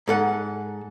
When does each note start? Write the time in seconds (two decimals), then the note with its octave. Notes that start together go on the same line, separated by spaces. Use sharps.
0.08 G#2 A4 F#5